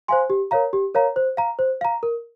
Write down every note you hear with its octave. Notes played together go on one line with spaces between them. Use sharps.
C5 F5 G#5 C6
G4
A#4 C#5 F5 A#5
G4
A#4 C#5 F5 A#5
C5
F5 A#5
C5
F5 A#5
A#4